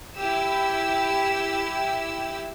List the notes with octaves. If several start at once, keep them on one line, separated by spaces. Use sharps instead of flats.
E4 G4 E6